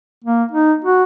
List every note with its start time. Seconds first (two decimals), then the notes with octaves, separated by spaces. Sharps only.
0.24 A#3
0.52 D#4
0.84 F#4